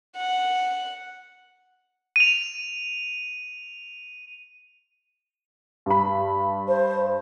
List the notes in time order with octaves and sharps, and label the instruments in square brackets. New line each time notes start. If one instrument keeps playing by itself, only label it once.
[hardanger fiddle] F#5
[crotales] D#7 F7
[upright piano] G2 B5
[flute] C5